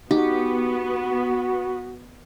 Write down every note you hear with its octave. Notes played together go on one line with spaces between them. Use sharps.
B3 D#4 F#4 G4